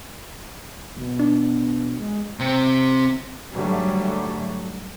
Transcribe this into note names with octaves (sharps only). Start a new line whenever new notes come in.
D#1 B2
D4
G#3
C3 C4
G#2 D3 F#3 G3 A3